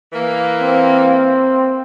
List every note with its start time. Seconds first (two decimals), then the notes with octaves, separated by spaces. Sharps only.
0.13 E3 A#3
0.62 C4